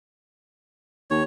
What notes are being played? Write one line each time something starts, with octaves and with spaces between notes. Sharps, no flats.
D#2 C#5